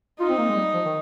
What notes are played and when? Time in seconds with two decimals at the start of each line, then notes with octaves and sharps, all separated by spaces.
0.20 D#4 F4
0.29 C4
0.38 A#3
0.49 G#3
0.55 G3
0.74 F3
0.85 D#3